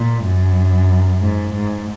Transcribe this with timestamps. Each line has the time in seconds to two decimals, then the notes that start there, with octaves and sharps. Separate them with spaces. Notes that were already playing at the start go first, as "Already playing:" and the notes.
Already playing: A#2
0.25 F#2
1.21 G#2
1.53 G#2